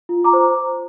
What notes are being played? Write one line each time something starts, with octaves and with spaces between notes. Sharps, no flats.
F4
A#5 D6
C5